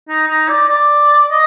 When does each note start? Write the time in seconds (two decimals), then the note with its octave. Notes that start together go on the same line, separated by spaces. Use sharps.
0.09 D#4
0.28 D#4
0.49 D5
0.69 D5
1.30 D#5